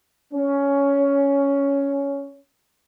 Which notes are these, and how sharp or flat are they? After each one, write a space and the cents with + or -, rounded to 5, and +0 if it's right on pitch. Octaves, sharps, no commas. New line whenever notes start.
C#4 +10